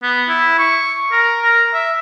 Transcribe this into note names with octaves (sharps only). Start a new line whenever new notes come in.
B3
E4
C#6
A#4
A#4
E5